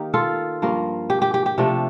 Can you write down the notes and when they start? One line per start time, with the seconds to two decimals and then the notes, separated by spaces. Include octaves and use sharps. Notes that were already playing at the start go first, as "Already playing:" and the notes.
Already playing: D#3 A#3 D#4 G4
0.14 F4 A4
0.62 G2 F3 A#3
1.10 G4
1.22 G4
1.34 G4
1.46 G4
1.58 C3 F3 A3 D4